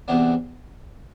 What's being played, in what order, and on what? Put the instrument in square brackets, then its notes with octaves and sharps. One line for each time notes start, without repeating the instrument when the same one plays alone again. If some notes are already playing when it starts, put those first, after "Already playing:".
[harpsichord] E2 C3 E3 B3 D4